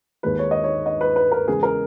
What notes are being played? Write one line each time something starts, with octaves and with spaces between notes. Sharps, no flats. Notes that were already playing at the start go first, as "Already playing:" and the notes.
D#2 D#3 G#3 B4
C#5
D#5
C#5
D#5
B4
B4
A#4
E2 C#3 G#3 G#4
A#4